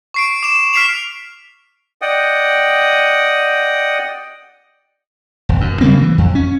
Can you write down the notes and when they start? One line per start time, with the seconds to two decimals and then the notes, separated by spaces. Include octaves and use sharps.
0.14 C#6 C7 D7
0.43 D6 E7
0.73 F6 B6 C7 D7 E7 F7
2.02 D5 D#5 F#5 G5 D#6
5.49 E1
5.61 F#2
5.81 C#3 G3 A#3 C4
6.02 E3
6.18 F2
6.35 C#4